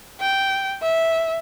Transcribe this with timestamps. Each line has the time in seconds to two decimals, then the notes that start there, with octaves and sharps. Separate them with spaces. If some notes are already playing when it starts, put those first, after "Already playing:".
0.21 G5
0.82 E5